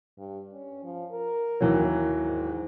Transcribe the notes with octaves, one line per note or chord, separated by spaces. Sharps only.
G2
C#4
F3
A#4
D#2 E3 F#3
G#2